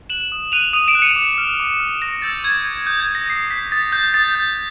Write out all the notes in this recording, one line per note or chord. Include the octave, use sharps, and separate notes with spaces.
F#6 E7 F#7
D#6
F#6 D#7 F7
D#6 D#7 F7
D7 E7
F#6
C#7 D#7
D6
F6
D6
F6
C#6 A#6
E6 G6 A6
C#6 G#6
E6 G6
D#6 G6
G#6
G6
A#6
D#6 C7
G6 B6
D#6 A6
G6
D#6 A6
G6